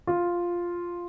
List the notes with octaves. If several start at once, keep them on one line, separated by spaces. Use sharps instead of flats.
F4